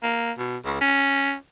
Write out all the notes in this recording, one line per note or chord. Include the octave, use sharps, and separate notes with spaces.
A#3
B2
C#2
C#4